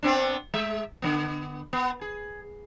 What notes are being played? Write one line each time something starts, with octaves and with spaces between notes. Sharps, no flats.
B3 C4 D4
G#3 E5
D3 F3 B3
B3
G#4